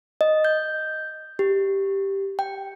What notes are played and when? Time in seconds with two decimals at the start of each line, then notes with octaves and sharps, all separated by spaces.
0.21 D#5
0.45 G6
1.39 G4
2.39 G5